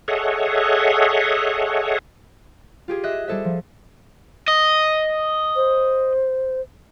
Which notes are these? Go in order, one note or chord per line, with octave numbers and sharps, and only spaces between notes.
G#4 A4 C#5 D#5 E5 F#5
F4 G4 G#4
D#5 E5 F#6
G3 G#4 A4 C5 E5
F3
D#5
C5